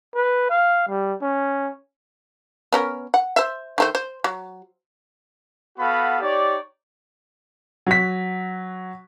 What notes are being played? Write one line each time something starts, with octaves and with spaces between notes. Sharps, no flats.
B4
F5
G3
C#4
B3 C#4 A#4
F#5
C5 E5
D#3 A3 C5
C5
F#3
B3 F#4 A4 F5 B5
D#4 G4 C#5 D5
F#3 B6